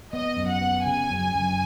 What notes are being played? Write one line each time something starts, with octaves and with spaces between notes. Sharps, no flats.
B3 D#5
F#2
F#5
B3
C#3 G#5
F#2
F#2